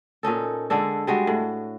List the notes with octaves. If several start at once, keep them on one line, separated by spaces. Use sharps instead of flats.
A#2 C#4 D#4 A4
D3 G#3 D4 A4
G3 G#3 F#4
A2